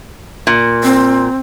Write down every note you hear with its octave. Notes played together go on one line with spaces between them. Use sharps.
A#2
C4